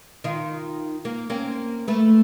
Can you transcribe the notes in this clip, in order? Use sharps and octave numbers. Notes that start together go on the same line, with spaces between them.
D#3 D#4 F4
A#3
A#3 C4 C#4
A3 B4